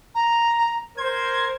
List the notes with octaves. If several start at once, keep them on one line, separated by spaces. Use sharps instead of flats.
A#5
A#4 C5 G#6